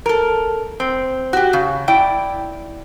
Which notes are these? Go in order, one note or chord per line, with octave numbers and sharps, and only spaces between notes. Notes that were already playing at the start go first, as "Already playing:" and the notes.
A4 A#4
C4
F#4 G4
C#3
E4 D5 G5